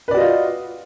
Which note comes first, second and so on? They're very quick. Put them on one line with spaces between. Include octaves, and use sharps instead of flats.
B4 D5 F#4 D#5 F4